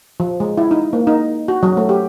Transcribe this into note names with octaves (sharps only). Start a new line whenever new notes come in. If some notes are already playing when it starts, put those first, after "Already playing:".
F3
G#3
E4
D#4
A#3
D#4
F#4
F#3
A3
G4